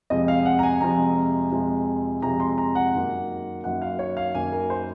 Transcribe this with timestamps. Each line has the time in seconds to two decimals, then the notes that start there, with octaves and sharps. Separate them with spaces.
0.10 F2 C3 F3 G#3 D#5
0.28 F5
0.45 F#5
0.59 A#5
0.63 G#5
0.81 F2 C3 F3 G#3 A#5
1.52 F2 C3 F3 G#3
2.22 F2 C3 F3 G#3 A#5
2.40 C6
2.58 A#5
2.75 F#5
2.93 F#2 D#3 F#3 A#3
3.64 F#2 D#3 F#3 A#3 F#5
3.82 F5
3.99 C#5
4.17 F5
4.35 F#2 D#3 F#3 A#3 G#5
4.52 A#4
4.70 C5